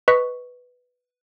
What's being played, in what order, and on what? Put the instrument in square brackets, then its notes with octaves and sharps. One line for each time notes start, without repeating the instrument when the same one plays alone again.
[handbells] B4 D#5 C#6 F#6 B6